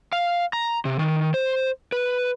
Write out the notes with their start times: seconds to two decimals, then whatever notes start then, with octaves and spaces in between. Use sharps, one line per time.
0.12 F5
0.53 A#5
0.85 C3
0.99 D#3
1.34 C5
1.92 B4